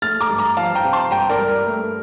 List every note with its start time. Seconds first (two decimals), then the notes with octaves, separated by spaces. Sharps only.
0.02 A3 F6 A6
0.21 A#5 D6
0.30 G2
0.38 A#5 D6
0.57 F3 F5 A5
0.75 G5 A#5
0.84 C3
0.93 A5 C6
1.11 G2 G5 A#5
1.30 A#4 D5
1.39 G2
1.47 A#4
1.66 A3